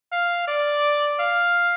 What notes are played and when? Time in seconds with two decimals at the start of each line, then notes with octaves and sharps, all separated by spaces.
0.12 F5
0.48 D5
1.20 F5